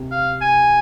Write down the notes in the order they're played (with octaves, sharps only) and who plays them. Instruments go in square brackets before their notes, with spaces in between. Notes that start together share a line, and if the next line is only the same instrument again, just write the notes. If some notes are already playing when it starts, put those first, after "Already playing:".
Already playing: [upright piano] C3
[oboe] F5
G#5